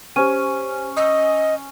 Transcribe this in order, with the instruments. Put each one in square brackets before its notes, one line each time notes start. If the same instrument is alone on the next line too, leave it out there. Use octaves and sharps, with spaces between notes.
[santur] C#4 [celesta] G4 C5 D#7
[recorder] D#5 [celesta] D#6 E6